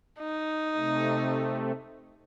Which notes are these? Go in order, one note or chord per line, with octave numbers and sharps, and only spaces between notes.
D#4
C3 A3